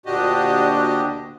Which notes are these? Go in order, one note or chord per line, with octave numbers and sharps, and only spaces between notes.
D2 A#2 D4 F#4 G4 D#5